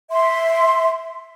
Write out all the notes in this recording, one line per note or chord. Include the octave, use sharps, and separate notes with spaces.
E5 C6